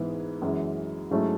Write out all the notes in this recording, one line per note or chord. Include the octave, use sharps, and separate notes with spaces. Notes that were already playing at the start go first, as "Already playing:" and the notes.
Already playing: G#2 E3 G#3 B3
F#2 E3 G#3
G#2 F#3 A3 C#4 E4